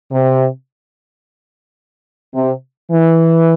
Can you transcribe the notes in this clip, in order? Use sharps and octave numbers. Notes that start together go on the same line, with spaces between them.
C3
C3
E3